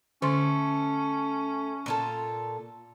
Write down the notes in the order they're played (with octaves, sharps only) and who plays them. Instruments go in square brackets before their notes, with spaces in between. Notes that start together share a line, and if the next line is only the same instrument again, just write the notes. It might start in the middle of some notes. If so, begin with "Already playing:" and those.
[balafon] D3 C6 [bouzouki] A3 [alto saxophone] C#4
[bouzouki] A#2 F4 A4